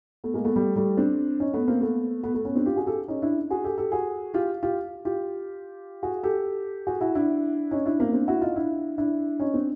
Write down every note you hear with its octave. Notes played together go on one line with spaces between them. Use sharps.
A3 B3
G#3 A#3
A3 B3
G3 A3
G3 A3
C4 D4
C#4 D#4
A3 B3
A#3 C4
A3 B3
A3 B3
A3 B3
B3 C#4
C4 D4
F4 G4
F#4 G#4
G4 A4
C#4 D#4
D4 E4
F#4 G#4
G4 A4
G4 A4
F#4 G#4
F4 G4
F4 G4
F4 G4
F#4 G#4
G4 A4
F#4 G#4
E4 F#4
D4 E4
C#4 D#4
D4 E4
A#3 C4
C4 D4
E4 F#4
D#4 F4
D4 E4
D4 E4
C#4 D#4
C4 D4